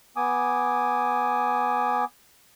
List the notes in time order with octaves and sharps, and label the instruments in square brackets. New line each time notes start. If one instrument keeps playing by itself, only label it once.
[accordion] B3 G#5 D6 D#6